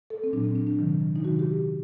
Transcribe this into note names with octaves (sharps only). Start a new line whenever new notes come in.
A4
C4
A#2 F#3 D4
C4
D4
D4
C3 D#3 F#3
D#4
C3 D#3 F#3 F#4
G4